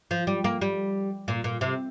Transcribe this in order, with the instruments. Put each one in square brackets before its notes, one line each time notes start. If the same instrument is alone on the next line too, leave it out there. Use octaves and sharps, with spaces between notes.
[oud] F3
G3
A#3
G3
A#2
A#2
C3